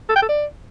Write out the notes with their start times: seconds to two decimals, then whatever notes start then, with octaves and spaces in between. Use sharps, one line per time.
0.09 A4
0.16 G5
0.22 A4
0.28 D5